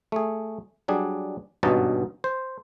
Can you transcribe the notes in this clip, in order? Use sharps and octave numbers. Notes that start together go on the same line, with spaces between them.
A3 G#4
F#3 G3 D4 G#4
G#1 G2 B2 C#4 D#4 A5
C5